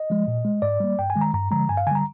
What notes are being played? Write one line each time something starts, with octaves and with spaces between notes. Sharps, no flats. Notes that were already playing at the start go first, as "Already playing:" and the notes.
Already playing: D#5
F3 G#3
A#2
G#3
G#2 D5
G3 A#3
G2 G5
G#5
D#3 G#3
A#5
G2 A#5
D3 F3 G#3 A#5
G2 G#5
F5
D3 G#5
G3 A#5